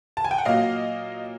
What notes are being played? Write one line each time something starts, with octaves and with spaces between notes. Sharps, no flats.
A5
G#5
G5
F#5
A#2 F#3 A#3 D#5 F5